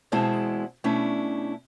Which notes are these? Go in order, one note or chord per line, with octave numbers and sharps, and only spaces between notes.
E2 B2 G#3 C4 E4 A5
B2 A3 C#4 D4 E4